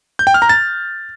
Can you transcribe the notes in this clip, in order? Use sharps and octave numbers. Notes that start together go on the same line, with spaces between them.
G6
G5
F6
A#5
A6